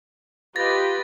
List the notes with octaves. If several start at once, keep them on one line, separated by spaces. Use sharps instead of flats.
F4 G4 B4 D#5 A6 A#6